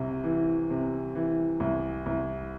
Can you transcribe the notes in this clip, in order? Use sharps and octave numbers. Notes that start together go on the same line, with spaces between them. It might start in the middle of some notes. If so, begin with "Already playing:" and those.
Already playing: C2 C3
E3
C3
E3
C2
C2